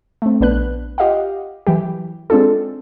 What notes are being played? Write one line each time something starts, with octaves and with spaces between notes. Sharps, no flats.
A3 C4
A#1 B3 D4 B4 F#6
F4 G4 D#5 F5 F#5
E3 F#3 G4
G#3 C4 D4 F4 A4